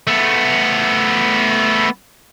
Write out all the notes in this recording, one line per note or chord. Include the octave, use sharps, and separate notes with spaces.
A3 B3